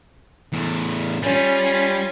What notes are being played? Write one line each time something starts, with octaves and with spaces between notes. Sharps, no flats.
E2 A2
G3 C#4 F4